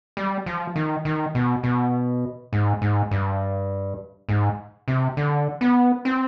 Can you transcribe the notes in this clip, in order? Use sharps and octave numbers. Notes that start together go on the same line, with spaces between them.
G3
F3
D#3
D#3
B2
B2
G#2
G#2
G2
G#2
C3
D3
B3
C4